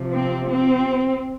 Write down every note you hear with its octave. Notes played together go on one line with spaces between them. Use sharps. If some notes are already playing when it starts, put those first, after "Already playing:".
Already playing: C3 F3
C4
C4